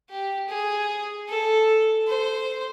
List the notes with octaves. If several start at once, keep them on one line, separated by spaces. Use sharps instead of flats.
G4
G#4
A4
C5